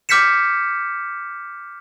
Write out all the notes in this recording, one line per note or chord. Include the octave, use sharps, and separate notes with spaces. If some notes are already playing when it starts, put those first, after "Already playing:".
D6 F6 G6 B6 C#7 E7